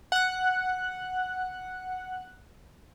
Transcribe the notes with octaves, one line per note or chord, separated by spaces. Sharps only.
F#5 F#6